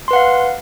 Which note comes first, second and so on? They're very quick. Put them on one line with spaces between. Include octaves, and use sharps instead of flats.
C6 B4 F#5 F5